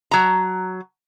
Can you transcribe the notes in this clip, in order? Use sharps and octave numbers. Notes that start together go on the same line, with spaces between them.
F#3 A#5